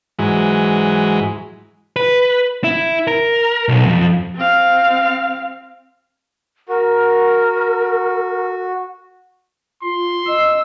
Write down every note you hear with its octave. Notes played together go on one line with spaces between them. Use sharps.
G#2 E3 F#3 G#3
B4
E4
A#4
B1
F2
C4 F5
F#4 A#4
F4 C6
D#5 E6